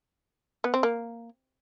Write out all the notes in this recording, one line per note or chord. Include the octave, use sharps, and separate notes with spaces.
B3
C4
A#3